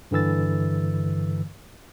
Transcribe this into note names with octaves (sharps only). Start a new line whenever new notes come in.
G2 D3 E3 E6 A6